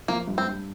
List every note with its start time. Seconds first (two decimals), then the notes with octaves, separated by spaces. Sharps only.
0.08 F3 A#3
0.27 G2
0.38 C4
0.47 G2